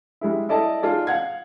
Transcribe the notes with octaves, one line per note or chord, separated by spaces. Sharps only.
G3 G#3 E4
E4 A4 D5 D#5 A5
D#4 F4 G#4 D5 A5
F5 F#5 G#6